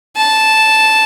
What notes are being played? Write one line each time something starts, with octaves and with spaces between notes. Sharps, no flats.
A5